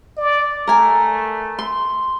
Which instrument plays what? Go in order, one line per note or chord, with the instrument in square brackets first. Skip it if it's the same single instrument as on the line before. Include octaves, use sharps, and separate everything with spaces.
[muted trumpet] D5
[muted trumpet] A3 [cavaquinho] A#4 G#5
[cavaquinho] C6